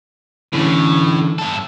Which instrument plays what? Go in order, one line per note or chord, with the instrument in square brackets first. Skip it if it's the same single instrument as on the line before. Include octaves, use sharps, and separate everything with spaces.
[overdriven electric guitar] A2 [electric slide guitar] D3 E3 C#4
[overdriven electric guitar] G2 A4